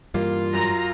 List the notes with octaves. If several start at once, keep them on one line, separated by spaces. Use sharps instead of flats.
G2 E3 G3 A#3 F4
F#2 A#5